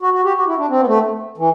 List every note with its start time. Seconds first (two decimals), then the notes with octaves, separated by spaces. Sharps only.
0.02 F#4
0.13 F#4
0.25 G4
0.37 F#4
0.47 E4
0.58 D4
0.69 C4
0.80 B3
0.87 A3
1.38 E3